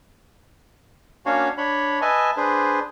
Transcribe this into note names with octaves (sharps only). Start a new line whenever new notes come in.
A#3 C#4 D4 F#4 C#5 F5
D4 C#5 B5
B4 D#5 E5 G#5 A5
D4 G#4 B4 C5